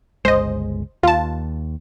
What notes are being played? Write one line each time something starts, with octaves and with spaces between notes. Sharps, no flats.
G1 C#2 G#3 C5 D#5
D#2 F4 A5